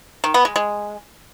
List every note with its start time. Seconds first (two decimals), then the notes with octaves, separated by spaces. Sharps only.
0.24 D#3
0.34 B3
0.45 G#3
0.56 G#3